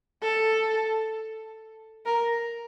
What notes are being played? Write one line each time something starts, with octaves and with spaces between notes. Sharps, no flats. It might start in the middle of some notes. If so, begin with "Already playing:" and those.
A4
A#4